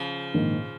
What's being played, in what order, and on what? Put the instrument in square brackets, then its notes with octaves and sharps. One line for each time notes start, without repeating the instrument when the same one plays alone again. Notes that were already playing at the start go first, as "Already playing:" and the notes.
Already playing: [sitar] C#3 F3
[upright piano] A#1 G#2 D#3 A#3